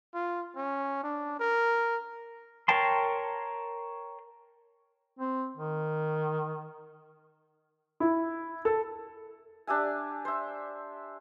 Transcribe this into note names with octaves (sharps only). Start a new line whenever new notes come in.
F4
C#4
D4
A#4
A#4 C#5 G5 A5 C6
C4
D#3
E4
A4
D4 G4 E5 G#5
C5 E5